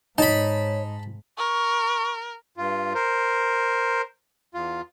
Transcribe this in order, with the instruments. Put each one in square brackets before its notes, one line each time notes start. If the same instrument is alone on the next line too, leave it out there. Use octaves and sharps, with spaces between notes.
[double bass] G#2 [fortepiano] D#4 [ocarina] C#5 [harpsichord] A5 B5
[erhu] A#4 [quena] C#6
[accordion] G2 F4
A#4 C5
E2 F4